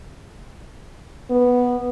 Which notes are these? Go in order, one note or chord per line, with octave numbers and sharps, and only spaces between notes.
B3